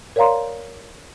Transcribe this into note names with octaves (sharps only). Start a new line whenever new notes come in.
A#4 C#5 D5 F5 A#5 C6